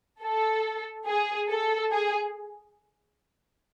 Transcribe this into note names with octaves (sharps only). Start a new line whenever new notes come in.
A4
G#4
A4
G#4